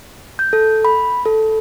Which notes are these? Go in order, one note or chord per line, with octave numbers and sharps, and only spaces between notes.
G6
A4
B5
A4